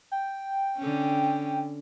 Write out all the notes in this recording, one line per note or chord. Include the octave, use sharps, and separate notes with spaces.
G5
D3 C#4